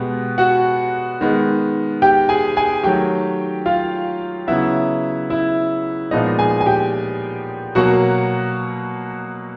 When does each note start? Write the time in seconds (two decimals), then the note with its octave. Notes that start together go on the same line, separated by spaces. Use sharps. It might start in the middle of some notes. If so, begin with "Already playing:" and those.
Already playing: B2 G#3 B3 G4
0.38 F#4 F#5
1.21 D#3 G#3 B3
2.02 G4 G5
2.29 G#4 G#5
2.57 G#4 G#5
2.84 D#3 F#3 A3 G4 G5
3.66 F4 F5
4.47 C#3 F#3 B3 E4 E5
5.30 E4 E5
6.11 A#2 F3 G#3 B3 D#4 D#5
6.39 G#4 G#5
6.61 G#5
6.66 G4 G5
7.75 B2 F#3 A#3 F#4 F#5